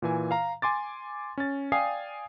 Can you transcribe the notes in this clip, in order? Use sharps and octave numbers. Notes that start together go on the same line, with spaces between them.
A#2 E3 G#5
F5 A#5
G#5 C6 D6 A6
C#4 A6
D5 F5 G5 G#5 D#6 C7